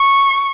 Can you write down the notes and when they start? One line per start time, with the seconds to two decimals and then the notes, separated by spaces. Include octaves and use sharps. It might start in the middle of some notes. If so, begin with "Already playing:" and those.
Already playing: C#6